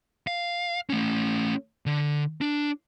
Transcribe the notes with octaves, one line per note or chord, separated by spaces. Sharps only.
F5
A3 C#4
D3
D4